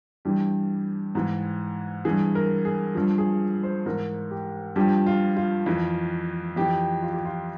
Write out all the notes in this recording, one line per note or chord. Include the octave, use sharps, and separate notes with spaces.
G2 E3 G4
G#2 E3
G2 E3 G#4
A#4
G#4
G2 F3
G#4
C5
G#2 E3 A#4
G4
G2 F3 G4
F4
F4
F2 E3
F2 E3 G4
F4
G4
F4